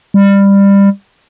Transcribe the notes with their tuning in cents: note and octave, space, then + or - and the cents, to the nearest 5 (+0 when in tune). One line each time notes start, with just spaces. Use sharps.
G3 +20